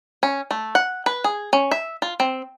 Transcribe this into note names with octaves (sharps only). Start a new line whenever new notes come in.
C#4
A3
F#5
B4
G#4
C#4
E5
F4
C4